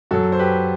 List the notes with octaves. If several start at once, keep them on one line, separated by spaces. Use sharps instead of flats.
F#2 F#3 F#4 A4
C5
G4 B4